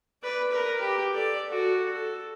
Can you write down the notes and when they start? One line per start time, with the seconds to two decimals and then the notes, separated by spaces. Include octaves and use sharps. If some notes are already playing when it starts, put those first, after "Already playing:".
0.23 B4 D5
0.51 A#4 B4
0.80 G4
1.13 A4 D5
1.50 F#4 A4
1.93 A4